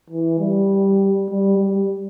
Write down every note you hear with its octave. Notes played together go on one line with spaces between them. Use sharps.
E3
G3
G3
G3